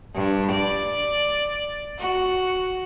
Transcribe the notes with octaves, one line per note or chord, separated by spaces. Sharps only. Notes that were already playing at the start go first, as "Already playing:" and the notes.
G2
D5
F#4